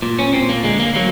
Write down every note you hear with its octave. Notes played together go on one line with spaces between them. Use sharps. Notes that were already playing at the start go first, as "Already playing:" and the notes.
A#2
C#4
A#2 C4
A#3
D3 G#3
A#3
F#3 A#3